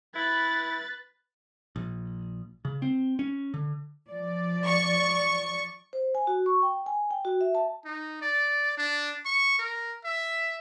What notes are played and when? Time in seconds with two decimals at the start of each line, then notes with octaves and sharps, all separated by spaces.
0.15 E4 B4 A6
1.76 A#1
2.65 C#3
2.82 C4
3.19 C#4
3.54 D3
4.09 F3 D5
4.67 C#6
5.93 C5
6.15 G#5
6.27 F#4
6.46 C#6
6.62 G5
6.86 G#5
7.11 G5
7.25 F#4
7.41 E5
7.55 A5
7.85 D#4
8.22 D5
8.78 D4
9.25 C#6
9.59 A#4
10.05 E5